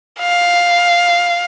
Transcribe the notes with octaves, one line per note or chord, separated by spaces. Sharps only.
F5